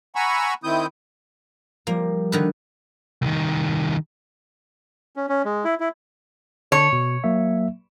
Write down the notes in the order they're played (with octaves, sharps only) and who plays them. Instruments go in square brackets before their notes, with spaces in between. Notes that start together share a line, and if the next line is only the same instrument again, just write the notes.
[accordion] F#5 G#5 A#5 B5 C#6 E6
D#3 C4 E4 D#6 G6
[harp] F3 G3 [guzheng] A#3
[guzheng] D3 D#3 B4
[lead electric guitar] C2 D#3
[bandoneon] C#4
C#4
G#3
E4
E4
[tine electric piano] D3 A5 [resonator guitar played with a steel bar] C#5
[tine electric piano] B2
F#3 A#3 E5